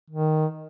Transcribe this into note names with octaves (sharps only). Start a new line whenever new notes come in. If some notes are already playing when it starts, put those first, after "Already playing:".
D#3